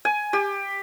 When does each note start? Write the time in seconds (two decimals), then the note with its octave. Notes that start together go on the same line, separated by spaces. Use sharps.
0.05 G#5
0.33 G4